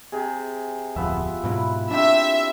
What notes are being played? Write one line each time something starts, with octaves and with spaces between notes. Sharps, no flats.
C3 G#4
D1 F2 F3 B3 E5
G#2 B2 F#3 E4 B4
C3 D4 G4 E5 C6